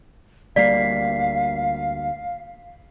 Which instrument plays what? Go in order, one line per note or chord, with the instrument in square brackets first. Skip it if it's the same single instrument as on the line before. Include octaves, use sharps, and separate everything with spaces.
[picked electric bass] D2 G3 A#3 [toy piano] D5 [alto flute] F5 [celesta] B6 C7